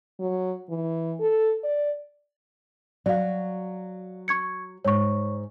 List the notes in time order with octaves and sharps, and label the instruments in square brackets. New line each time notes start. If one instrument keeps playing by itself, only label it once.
[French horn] F#3
E3
A4
D5
[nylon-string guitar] F#3 F#4 [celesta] D5 F5
[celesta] C#6 G#6 C#7
[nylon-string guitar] G#2 [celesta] C#5 C#6